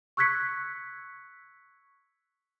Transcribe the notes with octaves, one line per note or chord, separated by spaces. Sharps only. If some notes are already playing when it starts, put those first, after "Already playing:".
C#6 E6 F#6 G#6 B6 C#7